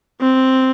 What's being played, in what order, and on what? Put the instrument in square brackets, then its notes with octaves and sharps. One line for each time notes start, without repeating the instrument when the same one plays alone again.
[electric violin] C4